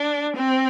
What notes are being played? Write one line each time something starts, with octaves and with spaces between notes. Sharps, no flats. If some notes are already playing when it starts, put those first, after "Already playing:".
Already playing: D4
C4